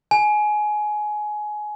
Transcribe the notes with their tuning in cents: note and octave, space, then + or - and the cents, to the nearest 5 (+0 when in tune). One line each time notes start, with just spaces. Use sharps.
G#5 +20